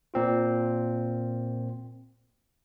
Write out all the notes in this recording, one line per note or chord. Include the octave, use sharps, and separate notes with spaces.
A#2 C4 F4